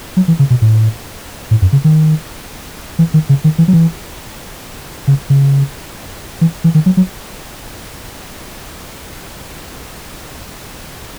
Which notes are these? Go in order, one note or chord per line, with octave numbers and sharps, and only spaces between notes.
F#3
E3
C#3
B2
A2
A2
F#2
C#3
D#3
E3
D#3
C#3
D#3
E3
F#3
E3
C#3
C#3
E3
E3
D#3
F#3
F#3